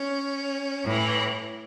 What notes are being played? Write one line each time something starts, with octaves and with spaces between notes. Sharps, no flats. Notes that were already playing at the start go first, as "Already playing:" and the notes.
Already playing: C#4
A2 E3